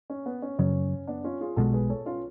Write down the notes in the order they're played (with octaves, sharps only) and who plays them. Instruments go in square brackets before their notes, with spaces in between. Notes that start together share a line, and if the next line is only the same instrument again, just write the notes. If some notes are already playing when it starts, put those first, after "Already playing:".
[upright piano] C#4
B3
C#4
[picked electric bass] F#2 C#3 F#3 [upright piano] C#4
[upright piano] B3 D4
C#4 F4
F4 G#4
[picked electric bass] B1 B2 G#3 [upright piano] F#4 A4
[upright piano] G#4 B4
A4 C#5
C#4 F4